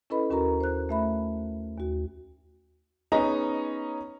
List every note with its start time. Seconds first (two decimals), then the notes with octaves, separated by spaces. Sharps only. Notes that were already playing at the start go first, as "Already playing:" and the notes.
0.10 C#4 E4 A4 B4 D#5 B5
0.30 D#2 C#4 F#4 A#4 A#5
0.60 C5 F#6
0.89 A3 E5 B5
1.77 D#2 F#4
3.12 B3 C#4 D#4 G#4 D#5 A#5